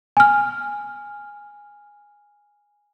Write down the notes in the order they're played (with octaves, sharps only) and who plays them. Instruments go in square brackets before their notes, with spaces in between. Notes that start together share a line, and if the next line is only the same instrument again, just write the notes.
[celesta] G#5 F6